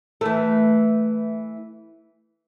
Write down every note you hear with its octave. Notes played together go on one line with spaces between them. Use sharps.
E3 A3